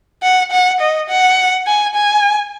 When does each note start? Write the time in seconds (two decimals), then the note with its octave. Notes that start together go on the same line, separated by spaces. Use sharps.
0.23 F#5
0.51 F#5
0.80 D#5
1.09 F#5
1.66 G#5
1.95 G#5